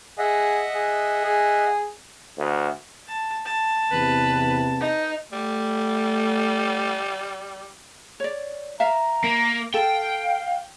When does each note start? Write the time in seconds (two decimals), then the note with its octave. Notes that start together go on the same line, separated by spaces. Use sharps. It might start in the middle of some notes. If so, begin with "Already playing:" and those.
0.18 G#4 D#5 E5 F#5
0.75 G#4
1.25 G#4
2.37 D2
3.08 A5
3.45 A5
3.91 E2 C3 B4
4.80 D#4
5.32 G3 A3
8.20 C#5 D5
8.80 E5 F5 A#5
9.24 A#3
9.74 A4 F5 G5